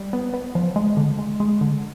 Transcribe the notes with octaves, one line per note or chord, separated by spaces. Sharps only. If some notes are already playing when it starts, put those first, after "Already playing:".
Already playing: G3
B3
B3
F3
G#3
D3
G#3
G#3
D3